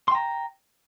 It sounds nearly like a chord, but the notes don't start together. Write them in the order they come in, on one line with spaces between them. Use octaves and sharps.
C6 G5 A#5